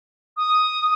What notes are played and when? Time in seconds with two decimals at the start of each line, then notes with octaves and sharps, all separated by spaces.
0.37 D#6